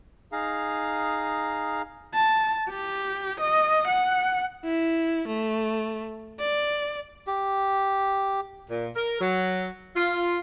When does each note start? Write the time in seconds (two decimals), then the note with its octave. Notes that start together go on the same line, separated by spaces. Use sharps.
0.32 D#4 G#4 F5 A#5
2.14 A5
2.69 G4
3.40 D#5
3.87 F#5
4.65 E4
5.28 A3
6.40 D5
7.27 G4
8.70 A#2
8.95 A#4
9.21 F#3
9.96 F4